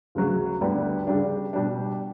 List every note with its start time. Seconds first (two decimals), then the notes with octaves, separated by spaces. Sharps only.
0.15 D2 C#3 F#3
0.61 D2 D3 G3 B3
1.07 C#3 G3 D4
1.53 B2 G3 D4